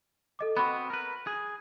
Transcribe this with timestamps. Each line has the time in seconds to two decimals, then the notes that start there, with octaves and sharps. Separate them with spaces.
0.39 A4 D#5 D6
0.57 B3 C4 F#4 B5
0.90 A#4 B4
1.27 G#4